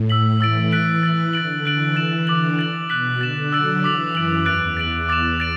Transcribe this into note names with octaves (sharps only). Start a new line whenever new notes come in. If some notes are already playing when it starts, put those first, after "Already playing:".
Already playing: A2
E6 B6 F#7
E3 E6 A6 D7 F#7
E3 F#6 B6 D7 F#7
A6 F#7
D3 A6 D7 F#7
E3 F#6 D7 F#7
A6 E7
D3 D6 A6 F#7
A6 D7 F#7
B2 F#6 B6 F#7
D3 A6 E7
F#3 E6 A6 D7 F#7
E3 D6 B6 F#7
F#2 A6 D7 F#7
E2 F#6 A6 D7
A6 D7 F#7
D6 A6 E7
A6 D7 F#7